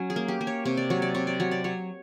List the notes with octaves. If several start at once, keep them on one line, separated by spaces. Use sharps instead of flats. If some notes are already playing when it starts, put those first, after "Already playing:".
Already playing: F#3 C#4
G#4
A#3
G4
A#3
C#5
C3 C#5
D5
F#3 C#5
D5
C3 C#5
D5
F#3 C#5
D5
F#3 C#5